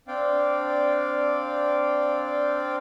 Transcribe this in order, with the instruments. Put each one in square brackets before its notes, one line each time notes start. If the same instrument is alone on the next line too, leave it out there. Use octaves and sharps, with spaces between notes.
[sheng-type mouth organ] C4 D4 D5 F5 G5